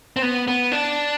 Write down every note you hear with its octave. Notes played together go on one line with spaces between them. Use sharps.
C4
B3
B3
D4